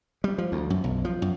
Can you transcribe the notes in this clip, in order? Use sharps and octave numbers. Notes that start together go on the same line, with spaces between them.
G3
F3
D2
F#2
B1
F3
F#2